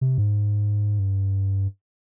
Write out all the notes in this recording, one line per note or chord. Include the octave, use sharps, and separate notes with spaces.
C3
G#2
G2